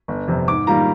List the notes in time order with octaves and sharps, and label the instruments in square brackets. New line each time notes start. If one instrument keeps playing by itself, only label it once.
[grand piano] G1
F2 C3
G#2 D6
D#3 G3 A#3 F4 A#5